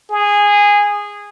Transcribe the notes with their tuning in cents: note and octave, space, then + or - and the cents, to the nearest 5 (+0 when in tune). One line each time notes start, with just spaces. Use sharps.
G#4 -15